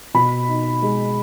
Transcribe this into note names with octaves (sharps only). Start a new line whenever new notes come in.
B2 B5
D#4
G#3